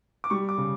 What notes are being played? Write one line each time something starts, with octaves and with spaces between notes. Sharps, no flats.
D6
G3 C#6
D6
C#3